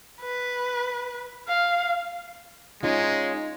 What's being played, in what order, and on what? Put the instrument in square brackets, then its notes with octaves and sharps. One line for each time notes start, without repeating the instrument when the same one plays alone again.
[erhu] B4
F5
[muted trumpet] G#3 [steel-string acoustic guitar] C#4 D#4 F4